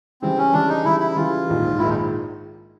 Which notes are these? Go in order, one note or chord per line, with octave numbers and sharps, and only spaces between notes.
C#3 E3 G3 C4
C#4
C#3 E3 G3 D4
D#4
C#3 E3 G3 E4
E4
C#3 E3 G3 F4
A#1 G#2 D#3 G#3
A#1 G#2 D#3 G#3 E4
D#4